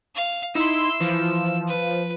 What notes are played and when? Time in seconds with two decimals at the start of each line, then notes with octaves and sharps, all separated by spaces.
0.15 F5
0.55 D#4 E4 C6 E6
1.01 E3 F3
1.68 B4